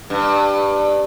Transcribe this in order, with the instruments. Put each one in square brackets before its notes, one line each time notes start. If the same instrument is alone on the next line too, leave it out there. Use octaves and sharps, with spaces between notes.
[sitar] G2